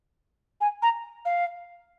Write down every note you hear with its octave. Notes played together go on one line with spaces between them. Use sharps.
G#5
A#5
F5